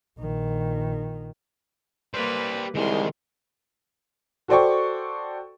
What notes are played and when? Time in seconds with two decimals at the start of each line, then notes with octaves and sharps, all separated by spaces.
0.19 A#1 D#3
2.14 G3 A#3 B4 C5
2.75 C2 D#3 E3 G#3 A#4 C6
4.48 F#4 A4 C5 D5 G5 C#6